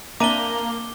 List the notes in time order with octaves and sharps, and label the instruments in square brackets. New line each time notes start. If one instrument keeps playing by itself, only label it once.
[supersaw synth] A#3 [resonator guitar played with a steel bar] C4 D4 E5 [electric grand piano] A#5 D#7 [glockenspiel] D6 G7